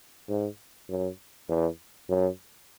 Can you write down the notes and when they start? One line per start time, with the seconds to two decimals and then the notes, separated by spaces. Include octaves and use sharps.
0.29 G#2
0.89 F#2
1.48 E2
2.09 F#2